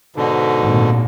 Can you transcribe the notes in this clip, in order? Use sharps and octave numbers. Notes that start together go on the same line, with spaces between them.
G#2 B2 D3
G#1 A#2